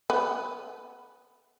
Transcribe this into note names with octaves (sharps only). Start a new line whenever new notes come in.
B3